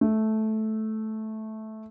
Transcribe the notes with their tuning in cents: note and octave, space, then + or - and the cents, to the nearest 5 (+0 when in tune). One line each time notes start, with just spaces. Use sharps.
A3 -10